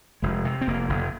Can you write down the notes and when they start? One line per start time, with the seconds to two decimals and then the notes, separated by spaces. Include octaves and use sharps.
0.22 F1 G#3
0.45 C3
0.61 C4
0.67 F1 A#3
0.89 F1